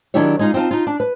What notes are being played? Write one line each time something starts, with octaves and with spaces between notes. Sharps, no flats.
D#3 F#3 D4 E4 G4 C#5
G#3 D#4 F4
C4 D#4 F4 A5
D#4 F4
D4
B4